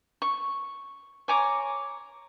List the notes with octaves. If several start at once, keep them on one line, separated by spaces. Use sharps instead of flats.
C#6
C#5 G#5 A#5 D6